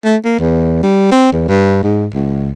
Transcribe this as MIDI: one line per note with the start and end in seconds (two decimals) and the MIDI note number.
0.05 0.17 57
0.25 0.35 58
0.40 0.81 40
0.83 1.10 55
1.12 1.31 60
1.32 1.44 40
1.49 1.82 43
1.83 2.07 44
2.14 2.52 37